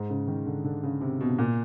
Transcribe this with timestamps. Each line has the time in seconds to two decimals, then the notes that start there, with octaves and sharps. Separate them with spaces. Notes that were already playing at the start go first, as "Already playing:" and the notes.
Already playing: G#2
0.10 C#3
0.28 D#3
0.46 D3
0.64 D3
0.83 C#3
1.01 C3
1.21 B2
1.39 A#2